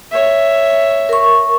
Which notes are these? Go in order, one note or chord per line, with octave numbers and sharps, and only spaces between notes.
C#5 E5
A#4 C#6